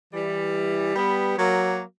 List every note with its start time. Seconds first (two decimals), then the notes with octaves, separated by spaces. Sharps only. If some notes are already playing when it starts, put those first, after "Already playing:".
0.13 E3 G3
0.95 G3 B3
1.37 F#3 A#3